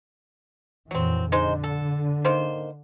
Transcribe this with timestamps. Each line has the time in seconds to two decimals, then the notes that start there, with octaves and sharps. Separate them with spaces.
0.91 F2 A#2 E3 F#3 C4
1.32 D3 G#3 D#4 C5
1.64 A4
2.25 D#3 A#3 C5